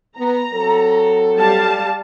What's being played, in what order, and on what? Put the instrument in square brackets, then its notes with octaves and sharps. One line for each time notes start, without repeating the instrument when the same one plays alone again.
[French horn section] B3 [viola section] A#5
[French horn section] F#3 C4 A4
[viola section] G3 F5 A5